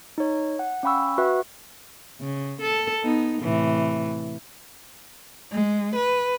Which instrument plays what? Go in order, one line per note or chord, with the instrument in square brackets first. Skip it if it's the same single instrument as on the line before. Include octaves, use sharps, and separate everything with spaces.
[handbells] D#4 C#5
F#5
C#4 F5 G5 B5 C#6 E6
F#4 B4 E5 F#5
[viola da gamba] C#3
A4
B3 D#4
A2 C3 E3
[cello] G#3
B4